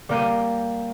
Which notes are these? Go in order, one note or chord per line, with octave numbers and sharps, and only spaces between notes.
G3 A#3 G6 D#7